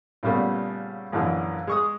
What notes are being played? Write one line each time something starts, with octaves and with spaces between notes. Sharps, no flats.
A#2 C#3 G3 A3 B3
A#1 F#2 D3 E3
G#3 C#6 D#6